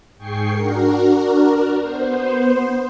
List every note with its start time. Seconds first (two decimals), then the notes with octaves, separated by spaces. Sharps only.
0.18 G#2 G#4 G5 C#6 C7
0.51 D4 F#4 A#4
1.80 B3 C5